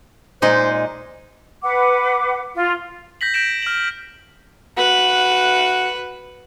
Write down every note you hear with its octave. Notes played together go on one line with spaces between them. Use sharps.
A#2 G#3 D#4 C5
B4 F#5 D6
F4
G6 A#6 B6 F#7
G6 A#6 D7 E7
F6 F#7
F#4 B4